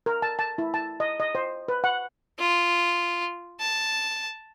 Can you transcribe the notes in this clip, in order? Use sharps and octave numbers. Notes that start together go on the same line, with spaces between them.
A#4
A5
A5
E4
A5
D#5
D#5
C5
B4
F#5
F4
A5